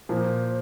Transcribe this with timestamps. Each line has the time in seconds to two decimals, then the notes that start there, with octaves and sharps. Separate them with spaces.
0.09 A#2 F3 A#3 C5